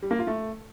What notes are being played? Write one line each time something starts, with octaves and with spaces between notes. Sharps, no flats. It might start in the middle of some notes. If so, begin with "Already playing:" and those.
G3
A#3
F4
A3